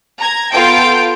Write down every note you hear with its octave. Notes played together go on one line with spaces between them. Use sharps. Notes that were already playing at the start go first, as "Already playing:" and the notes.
A#5 G#6
B3 F4 A4 G5 G6 D7